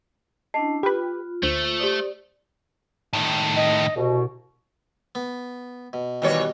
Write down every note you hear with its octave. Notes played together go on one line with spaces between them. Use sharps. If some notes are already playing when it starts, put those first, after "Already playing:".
C#4 D4 E4 D#5 A5 C7
F4 G4 B4 B5 F#6
D2 A3 C5
G4 C5 D5 D#6
A2 D#3
D#5
C2 B2
B3
B2
D#2 B2 E3 G3 C#5